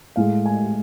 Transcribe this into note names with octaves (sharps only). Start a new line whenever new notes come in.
A2 G#3 F5
G#5